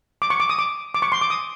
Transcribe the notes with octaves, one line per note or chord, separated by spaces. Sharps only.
D6
C#6
D6
D#6
D6
D6
C#6
C6
D6
D#6